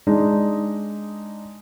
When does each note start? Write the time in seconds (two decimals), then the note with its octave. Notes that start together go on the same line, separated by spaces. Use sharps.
0.07 G#3 D4 D#4